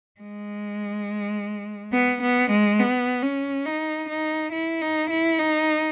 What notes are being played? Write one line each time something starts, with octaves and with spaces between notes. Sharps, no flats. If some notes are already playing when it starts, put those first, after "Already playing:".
G#3
B3
B3
G#3
B3
C#4
D#4
D#4
E4
D#4
E4
D#4